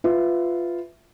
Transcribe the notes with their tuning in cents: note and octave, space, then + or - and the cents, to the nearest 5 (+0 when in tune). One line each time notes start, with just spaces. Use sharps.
F4 +0 B4 +15 E5 +0